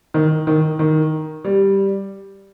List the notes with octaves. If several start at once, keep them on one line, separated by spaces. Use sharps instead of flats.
D#3
D#3
D#3
G3